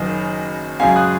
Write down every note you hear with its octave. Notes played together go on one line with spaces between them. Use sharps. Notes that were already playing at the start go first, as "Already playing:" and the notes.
Already playing: F#1 F#2 D#3 F#3 D#5
F#2 C#3 G#3 C#4 F5 G#5
D#6 F#6